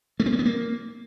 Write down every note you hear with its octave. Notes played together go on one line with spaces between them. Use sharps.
A3
C4
A#3
B3
A#3